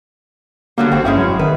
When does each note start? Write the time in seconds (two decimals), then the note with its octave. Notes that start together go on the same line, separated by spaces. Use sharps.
0.78 D3 F#3 G3 A#3
0.92 G1 C4 F#4
1.05 G1 G#3 C#4 E4
1.18 F#3
1.39 D#3 B4